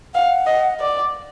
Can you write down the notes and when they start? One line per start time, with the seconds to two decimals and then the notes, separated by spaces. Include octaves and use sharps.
0.14 F5 F#5
0.47 D#5
0.80 D5